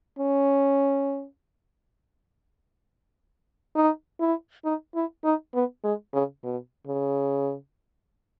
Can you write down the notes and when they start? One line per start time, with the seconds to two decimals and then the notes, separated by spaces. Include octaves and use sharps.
0.19 C#4
3.75 D#4
4.20 E4
4.65 D#4
4.95 E4
5.24 D#4
5.55 B3
5.84 G#3
6.14 C#3
6.43 B2
6.88 C#3